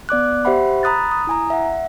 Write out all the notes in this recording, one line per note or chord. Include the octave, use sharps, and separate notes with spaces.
B3 D5 D6 F#6
G4 C5 E5 F#5 B5
A#5 B5 D#6 F#6 A6
D#6
E4 G#5 A#5
E5 F#5